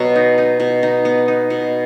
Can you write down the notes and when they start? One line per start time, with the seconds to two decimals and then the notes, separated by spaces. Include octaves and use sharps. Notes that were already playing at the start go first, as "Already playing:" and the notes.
Already playing: B2 F#3
0.16 D#4
0.38 D#4
0.60 B2
0.83 D#4
1.05 B3
1.28 D#4
1.50 B2